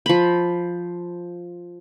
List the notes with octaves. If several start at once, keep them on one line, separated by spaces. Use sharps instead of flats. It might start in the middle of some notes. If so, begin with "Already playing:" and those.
F3 B5